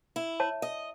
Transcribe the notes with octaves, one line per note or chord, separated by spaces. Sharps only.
E4
C#5 A5
D#5